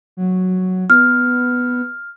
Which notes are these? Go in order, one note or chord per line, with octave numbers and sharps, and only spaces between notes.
F#3
B3 F6